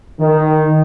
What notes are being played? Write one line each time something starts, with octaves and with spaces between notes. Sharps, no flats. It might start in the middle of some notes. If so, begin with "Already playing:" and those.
D#3